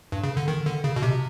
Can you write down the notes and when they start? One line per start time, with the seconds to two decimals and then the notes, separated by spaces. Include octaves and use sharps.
0.12 G2
0.24 C#3
0.37 D3
0.48 D#3
0.66 D3
0.84 C#3
0.96 B2
1.02 C3